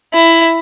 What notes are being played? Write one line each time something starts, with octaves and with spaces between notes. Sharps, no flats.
E4